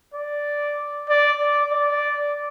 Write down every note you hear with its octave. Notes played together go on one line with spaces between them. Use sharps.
D5
D5
D5
D5